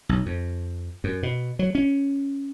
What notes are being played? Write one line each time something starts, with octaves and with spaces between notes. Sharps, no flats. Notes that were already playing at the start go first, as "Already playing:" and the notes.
B1
F2
F#2
B2
F#3
C#4